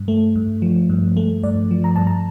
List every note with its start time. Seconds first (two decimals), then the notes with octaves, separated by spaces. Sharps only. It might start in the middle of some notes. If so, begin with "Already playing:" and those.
Already playing: G2
0.08 A3
0.36 G2
0.62 F3
0.89 G2
1.17 A3
1.44 G2 D5
1.71 F3
1.84 A#5
1.96 G2 A5
2.07 A#5